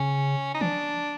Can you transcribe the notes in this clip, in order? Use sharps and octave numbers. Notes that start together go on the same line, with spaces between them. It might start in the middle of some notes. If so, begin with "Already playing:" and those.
Already playing: C#3 C#4
D#4
E3 D4